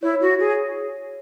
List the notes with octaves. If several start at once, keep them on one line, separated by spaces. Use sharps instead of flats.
E4 C#5
F#4
G#4